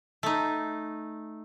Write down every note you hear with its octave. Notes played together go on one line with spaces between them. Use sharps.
A3 D#4